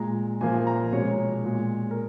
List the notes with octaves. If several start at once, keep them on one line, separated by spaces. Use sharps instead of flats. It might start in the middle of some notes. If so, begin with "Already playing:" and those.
Already playing: A#2 G#3 A#5
A#2 F3 A#3 G#5
A#5
B2 G#3 C#5
A#2 G#3
A#4